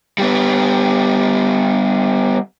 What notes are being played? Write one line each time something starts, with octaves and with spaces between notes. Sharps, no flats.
G3 B3